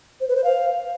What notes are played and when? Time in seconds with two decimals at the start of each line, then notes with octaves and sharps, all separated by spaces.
0.21 C5
0.28 B4
0.36 C5
0.44 F5